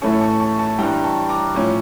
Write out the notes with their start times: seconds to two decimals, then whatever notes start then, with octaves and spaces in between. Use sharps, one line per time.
0.02 A2 E3 A3 C#4 A5 C#6
0.21 A5 C#6
0.40 A5 C#6
0.59 A5 C#6
0.78 G2 E3 G3 G5 A#5
0.94 A#5
1.04 A5 C#6
1.29 A#5 D6
1.55 A2 F3 C#4